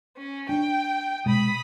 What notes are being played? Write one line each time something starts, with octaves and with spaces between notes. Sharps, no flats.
C#4
D4 G5
B2 G#3 B5 D#6